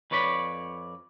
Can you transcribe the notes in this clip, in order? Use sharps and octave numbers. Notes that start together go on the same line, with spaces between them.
F2 B4 C#5 D5 B5